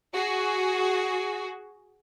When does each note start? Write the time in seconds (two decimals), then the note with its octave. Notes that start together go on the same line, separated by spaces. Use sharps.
0.13 F#4 G#4